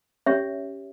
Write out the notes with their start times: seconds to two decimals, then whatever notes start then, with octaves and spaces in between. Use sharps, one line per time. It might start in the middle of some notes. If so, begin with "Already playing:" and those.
0.26 C#4 G4 C#5 E5